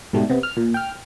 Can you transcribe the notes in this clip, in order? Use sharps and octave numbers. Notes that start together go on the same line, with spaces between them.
G#2 B2 G3 A3
C3 B3
F6
A#2
G5 F6